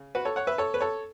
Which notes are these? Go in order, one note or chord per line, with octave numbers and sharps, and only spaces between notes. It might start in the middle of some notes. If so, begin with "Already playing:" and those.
Already playing: C#3
F#4 B4
A4 C#5
C#5 F#5
B4 E5
A4 C#5
B4
A4 C#5